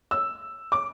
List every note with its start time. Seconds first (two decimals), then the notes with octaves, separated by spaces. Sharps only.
0.11 E6
0.72 D6